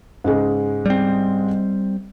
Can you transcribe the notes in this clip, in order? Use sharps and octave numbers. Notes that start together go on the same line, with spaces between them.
G#2 C#3 G#3
G3 C4